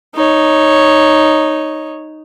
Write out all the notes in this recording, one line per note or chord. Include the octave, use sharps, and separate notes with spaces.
D#4 C#5